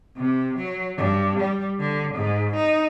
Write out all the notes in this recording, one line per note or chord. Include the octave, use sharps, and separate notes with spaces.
C3
F#3
G2
G3
D3
G#2
D#4